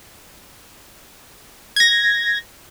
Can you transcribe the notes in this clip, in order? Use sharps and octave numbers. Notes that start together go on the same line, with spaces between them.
G#6 A#6